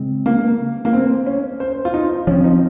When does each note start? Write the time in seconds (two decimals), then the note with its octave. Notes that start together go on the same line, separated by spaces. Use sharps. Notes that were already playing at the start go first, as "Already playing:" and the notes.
Already playing: C#3 G#3 C4
0.26 A#3
0.85 A#3
0.93 C4
1.27 C#4
1.60 C5
1.85 F4
1.94 D#4
2.27 F3 C#4
2.31 C4
2.44 D#4